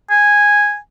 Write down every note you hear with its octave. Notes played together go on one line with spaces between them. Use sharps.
G#5